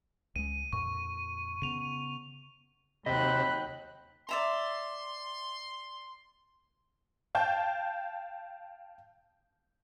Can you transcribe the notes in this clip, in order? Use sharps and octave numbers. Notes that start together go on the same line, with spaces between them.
C#2 G#3 D#7
F2 A#2 C#6
C#3 B3 D#7 F7
D#2 C3 F#3 D#5 G5 B5 F#6
D5 E5 A#5 C6
F5 G5 A5 G6